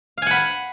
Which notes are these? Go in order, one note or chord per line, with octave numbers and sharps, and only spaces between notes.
F5 F#5 G#5 B5